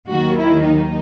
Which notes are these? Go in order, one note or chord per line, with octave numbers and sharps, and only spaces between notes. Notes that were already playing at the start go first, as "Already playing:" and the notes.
D#2 D#3 F#3 F#4
E4
D#4